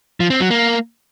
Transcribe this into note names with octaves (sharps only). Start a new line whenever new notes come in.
F3
C4
F#3
A#3